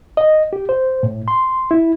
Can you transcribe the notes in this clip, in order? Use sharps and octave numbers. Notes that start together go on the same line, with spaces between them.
D#5
G4
C5
A2
C6
E4